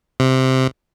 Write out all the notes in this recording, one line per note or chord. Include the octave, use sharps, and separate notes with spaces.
C3